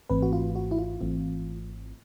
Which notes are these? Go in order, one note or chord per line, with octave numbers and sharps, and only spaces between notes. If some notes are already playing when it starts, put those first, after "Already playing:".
G#1 G#2 E3 A3 C4 B4
F#4
F4
F#4
E4
F4
G#1 G#2 E3 A3 C4